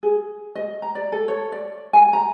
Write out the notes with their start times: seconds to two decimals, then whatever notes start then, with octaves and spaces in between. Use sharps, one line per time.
0.03 G#4
0.55 D#5
0.82 A#5
0.95 D5
1.12 A4
1.28 C#5
1.52 D5
1.93 G#5
2.13 A#5